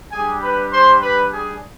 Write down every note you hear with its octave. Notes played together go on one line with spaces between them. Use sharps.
G3 D4 G4 G#4 G#5
B4 B5
C5 C6
B4 B5
G#4 G#5